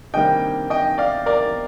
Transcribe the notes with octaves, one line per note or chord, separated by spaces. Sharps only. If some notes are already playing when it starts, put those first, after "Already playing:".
C3 D#3 G3 A#3 D4 D#5 G5
D#5 G5
D5 F5
A#4 D5